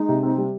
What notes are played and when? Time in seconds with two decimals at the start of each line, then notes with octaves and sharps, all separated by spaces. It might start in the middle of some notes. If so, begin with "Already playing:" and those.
Already playing: G#3 D#4
0.09 C3
0.23 C4
0.38 G3